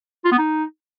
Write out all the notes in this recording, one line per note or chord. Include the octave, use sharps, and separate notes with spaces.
F4
B3
D#4